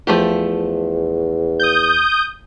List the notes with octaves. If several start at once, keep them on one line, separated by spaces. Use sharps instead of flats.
E2 F3 A3 G4
D#6 G6